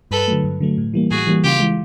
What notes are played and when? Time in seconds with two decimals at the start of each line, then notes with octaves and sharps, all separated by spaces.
0.11 G2 A4 B4
0.28 D3 F#3 A3
0.44 G2
0.60 D3 F#3 A3
0.78 A2
0.94 E3 G3 A#3
1.10 A2 F#4 G#4
1.27 E3 G3 A#3
1.44 C#3 F4 G4
1.60 E3 G#3